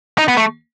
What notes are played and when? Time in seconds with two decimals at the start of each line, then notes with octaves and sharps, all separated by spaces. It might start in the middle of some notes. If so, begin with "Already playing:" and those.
0.18 D#4
0.28 B3
0.37 A3